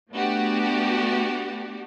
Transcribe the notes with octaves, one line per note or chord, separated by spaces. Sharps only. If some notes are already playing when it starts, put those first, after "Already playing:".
A3 B3 D4 F#4 G4